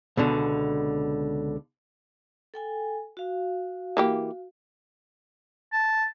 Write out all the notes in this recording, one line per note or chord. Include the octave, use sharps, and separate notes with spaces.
C#2 B2 D3
A4 G5 G#5
F#4 F5
E3 A#3 G4
A5